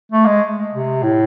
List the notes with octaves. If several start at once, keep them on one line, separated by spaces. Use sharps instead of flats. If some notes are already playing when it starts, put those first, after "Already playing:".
A3
G#3
C3
A2